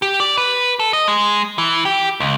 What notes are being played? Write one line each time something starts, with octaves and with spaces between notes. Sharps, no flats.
G4
D5
B4
A4
D#5
G#3
E3
G4
C#2